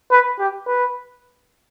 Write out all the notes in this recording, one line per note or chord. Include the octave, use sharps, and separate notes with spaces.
B4
G4
B4